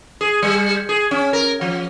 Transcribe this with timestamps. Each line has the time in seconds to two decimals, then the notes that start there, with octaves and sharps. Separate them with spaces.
0.21 G#4
0.42 G3
0.89 G#4
1.11 C#4
1.33 A#4
1.61 F3